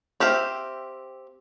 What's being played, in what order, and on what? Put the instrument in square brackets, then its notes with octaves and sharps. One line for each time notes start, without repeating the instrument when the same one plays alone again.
[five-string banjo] C4 G4 E5 F5